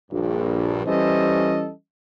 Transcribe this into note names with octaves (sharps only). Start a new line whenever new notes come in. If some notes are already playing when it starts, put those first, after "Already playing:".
A#1 G2
E3 G3 C#4 A4 C5 D#5